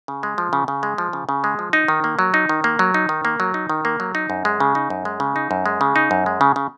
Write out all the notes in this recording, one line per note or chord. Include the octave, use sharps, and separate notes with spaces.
C#3
G#3
F3
C#3
C#3
G#3
F3
C#3
C#3
G#3
F3
D#4
D#3
A#3
F#3
D#4
D#3
A#3
F#3
D#4
D#3
A#3
F#3
D#4
D#3
A#3
F#3
D#4
F#2
G#3
C#3
D#4
F#2
G#3
C#3
D#4
F#2
G#3
C#3
D#4
F#2
G#3
C#3
C#3